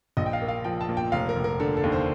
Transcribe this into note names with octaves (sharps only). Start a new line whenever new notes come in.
A#1 D#5
G5
F5
A#3
F5
F3 G5
A5
A#2
G5
F1 F5
A#4
F1
A#4
D3 A4
A4
D#2
C5